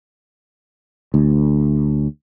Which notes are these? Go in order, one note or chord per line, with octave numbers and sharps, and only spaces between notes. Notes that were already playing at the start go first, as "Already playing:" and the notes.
D2